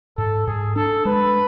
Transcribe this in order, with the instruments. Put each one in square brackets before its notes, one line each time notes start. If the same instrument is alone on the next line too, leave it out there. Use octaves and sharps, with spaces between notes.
[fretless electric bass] G#2 [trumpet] A4
[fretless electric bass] G#2 [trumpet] G#4
[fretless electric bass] D4 [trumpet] A4
[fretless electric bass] G#3 [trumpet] B4